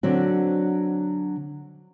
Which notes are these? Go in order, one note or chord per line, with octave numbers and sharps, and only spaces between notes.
D3 F#3 C4 F#4